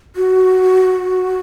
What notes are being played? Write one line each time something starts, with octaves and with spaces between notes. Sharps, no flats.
F#4